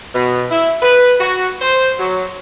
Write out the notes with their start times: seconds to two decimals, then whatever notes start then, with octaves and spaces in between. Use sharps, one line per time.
0.15 B2
0.51 E4
0.82 B4
1.20 F#4
1.62 C5
1.99 F#3